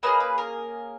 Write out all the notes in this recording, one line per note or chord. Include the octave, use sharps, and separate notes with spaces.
A#3 C#4 G#4 B4 D#5
B4
A#4